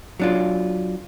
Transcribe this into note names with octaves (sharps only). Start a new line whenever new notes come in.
F#3 D4 F4